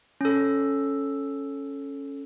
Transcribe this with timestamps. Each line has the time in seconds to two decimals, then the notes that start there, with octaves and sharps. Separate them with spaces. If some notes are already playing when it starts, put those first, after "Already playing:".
0.21 C#4 A4